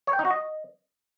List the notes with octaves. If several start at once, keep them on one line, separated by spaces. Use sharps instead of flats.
C#5
G5
D#4
F#4
D#5